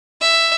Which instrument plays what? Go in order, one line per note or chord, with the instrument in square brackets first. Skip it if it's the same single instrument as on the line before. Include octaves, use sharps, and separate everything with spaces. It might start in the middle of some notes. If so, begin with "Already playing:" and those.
[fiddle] E5